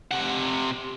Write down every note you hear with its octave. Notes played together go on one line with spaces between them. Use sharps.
C3 F#5